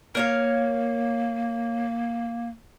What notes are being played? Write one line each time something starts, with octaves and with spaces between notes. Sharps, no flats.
A#3 A#4 C#5 F5